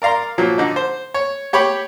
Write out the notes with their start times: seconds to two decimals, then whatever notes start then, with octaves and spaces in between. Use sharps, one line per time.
0.02 A#4 D5 F5 A#5 C6
0.38 A#2 F3 F#3
0.58 D3 D#4
0.76 C5
1.14 C#5
1.53 G4 C#5 G5 B5 D6